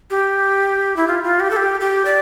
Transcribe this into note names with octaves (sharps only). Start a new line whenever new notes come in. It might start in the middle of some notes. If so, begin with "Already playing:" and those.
G4
E4
F4
F4
G4
A4
G4
G4
D5